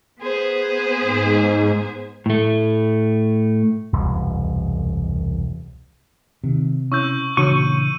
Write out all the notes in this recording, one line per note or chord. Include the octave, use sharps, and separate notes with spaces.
B3 G#4 C5
G#2
A2 A3
E1 C2 F#2
C3 D#3
C#4 E4 C#6 E6 G6
C#3 E3 D4 F#4 C#5 C#6 D#7
A#2